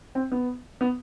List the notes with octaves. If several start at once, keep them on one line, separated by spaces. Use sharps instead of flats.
C4
B3
B3